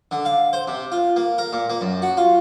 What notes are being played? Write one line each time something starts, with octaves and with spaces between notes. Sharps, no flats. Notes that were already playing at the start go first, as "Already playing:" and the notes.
D3
F5
C5
C3
F4
A#3
A#4
A#2
A#3
F#2
F#4
F4